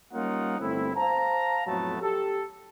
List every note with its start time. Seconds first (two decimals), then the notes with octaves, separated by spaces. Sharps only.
0.14 G3 A#3 C#4 D#4 F4 F#5
0.60 G1 A3 C4 E4
0.96 C5 F5 A5 A#5
1.67 F2 A2 F#3 A3 B3 A5
2.01 G4 A4